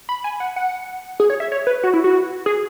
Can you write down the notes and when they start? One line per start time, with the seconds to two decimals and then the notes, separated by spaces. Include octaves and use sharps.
0.09 B5
0.24 G#5
0.40 F#5
0.56 F#5
1.20 G#4
1.30 C#5
1.40 E5
1.52 C#5
1.67 B4
1.83 F#4
1.93 E4
2.04 F#4
2.46 G#4